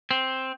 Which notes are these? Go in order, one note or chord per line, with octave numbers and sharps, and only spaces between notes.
C4